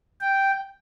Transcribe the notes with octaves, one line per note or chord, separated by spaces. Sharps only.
G5